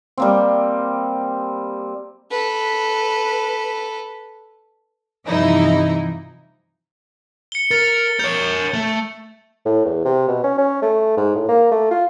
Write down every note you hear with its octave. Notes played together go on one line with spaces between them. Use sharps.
G3 A#3 C4
A4 B4
G2 C3 E3 F3 D#4 E4
C#7 G7
A#4 A6
A#4 C#5 G6
A3
A2
E2
C3
B2
C#4
C#4
A3
G#2
A2
A#3
A3
F4